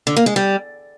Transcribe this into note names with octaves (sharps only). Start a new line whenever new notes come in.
D3
A#3
G#3
G3